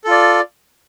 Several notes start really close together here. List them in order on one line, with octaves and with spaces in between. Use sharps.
A4 F4 D5